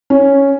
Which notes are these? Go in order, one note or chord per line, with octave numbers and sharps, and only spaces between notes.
C#4